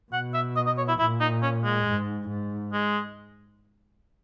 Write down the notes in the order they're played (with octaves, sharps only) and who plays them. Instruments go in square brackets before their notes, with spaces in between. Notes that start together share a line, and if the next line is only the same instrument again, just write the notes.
[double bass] B2 [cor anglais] F#5
[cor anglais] E5
D#5
D#5
C#5
E4
[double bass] A#2 [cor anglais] E4
[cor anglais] D#4
C#4
G#3
[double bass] G#2
G#2
[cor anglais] G#3